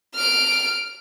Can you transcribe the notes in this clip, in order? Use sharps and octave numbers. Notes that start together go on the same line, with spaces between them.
F6 D7